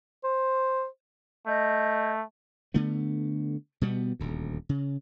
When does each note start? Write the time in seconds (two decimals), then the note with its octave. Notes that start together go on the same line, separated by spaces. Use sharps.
0.24 C5
1.46 A3 D#5 G6
2.74 D3 A3 B3
3.81 B2 G3 B3
4.20 D#1 D2
4.69 C#3